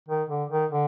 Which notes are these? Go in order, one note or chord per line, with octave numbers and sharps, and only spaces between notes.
D#3
D3
D#3
D3